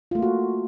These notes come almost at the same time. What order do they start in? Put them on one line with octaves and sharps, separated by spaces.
F4 A3 A#3 F#4